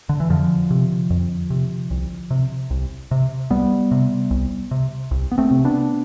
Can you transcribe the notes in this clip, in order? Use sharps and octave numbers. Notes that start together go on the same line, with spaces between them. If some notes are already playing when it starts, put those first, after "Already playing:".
D3
E3
F2 D3 F3
C3
F2
C3
C2
C3
C2
C3
C2 G3 B3
C3
C2
C3
C2
B3
A3 C4
C3
B3 D4